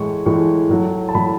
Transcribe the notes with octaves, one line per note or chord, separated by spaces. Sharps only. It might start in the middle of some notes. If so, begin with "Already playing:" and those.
Already playing: A2 E3 G#3 C#6
A2 E3 G#3 C#6
A2 F#3 A3
A5
A2 F#3 A3 B5